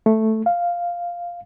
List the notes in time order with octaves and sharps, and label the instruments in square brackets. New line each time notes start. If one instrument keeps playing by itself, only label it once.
[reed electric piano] A3
F5